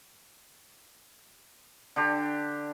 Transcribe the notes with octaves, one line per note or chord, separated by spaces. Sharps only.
D3 D4 G4